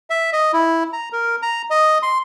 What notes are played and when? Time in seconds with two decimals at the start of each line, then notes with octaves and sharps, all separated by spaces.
0.10 E5
0.33 D#5
0.53 E4
0.93 A#5
1.13 A#4
1.42 A#5
1.70 D#5
2.03 C6